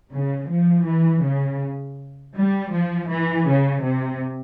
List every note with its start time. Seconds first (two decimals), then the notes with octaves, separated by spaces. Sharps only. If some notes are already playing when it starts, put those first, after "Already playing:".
0.13 C#3
0.49 F3
0.86 E3
1.23 C#3
2.36 G3
2.73 F3
3.09 E3
3.47 C#3
3.84 C3